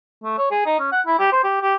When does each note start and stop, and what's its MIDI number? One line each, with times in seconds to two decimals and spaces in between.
0.24 0.38 57
0.38 0.48 73
0.51 0.63 68
0.66 0.79 63
0.80 0.89 61
0.92 1.01 78
1.07 1.18 64
1.19 1.29 67
1.32 1.42 72
1.44 1.59 67
1.62 1.75 67